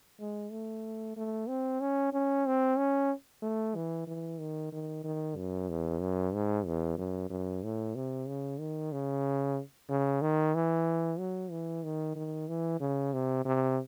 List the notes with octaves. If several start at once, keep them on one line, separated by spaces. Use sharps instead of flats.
G#3
A3
A3
C4
C#4
C#4
C4
C#4
A3
E3
E3
D#3
D#3
D#3
F#2
E2
F#2
G#2
E2
F#2
F#2
A2
C3
C#3
D#3
C#3
C#3
D#3
E3
F#3
E3
D#3
D#3
E3
C#3
C3
C3